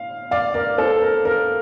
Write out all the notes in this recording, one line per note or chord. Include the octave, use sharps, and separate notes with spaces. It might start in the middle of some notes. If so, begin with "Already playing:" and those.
Already playing: F5
D5 F5
A#4 D5
A4 C5
A#4
A#4